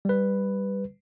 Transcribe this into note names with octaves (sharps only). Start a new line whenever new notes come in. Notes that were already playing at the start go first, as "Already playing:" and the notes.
G3 B4